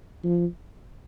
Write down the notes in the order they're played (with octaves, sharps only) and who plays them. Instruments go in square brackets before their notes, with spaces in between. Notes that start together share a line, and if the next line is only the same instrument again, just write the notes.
[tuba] F3